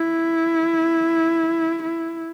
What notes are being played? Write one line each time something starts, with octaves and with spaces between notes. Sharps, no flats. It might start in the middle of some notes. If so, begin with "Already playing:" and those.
Already playing: E4
E4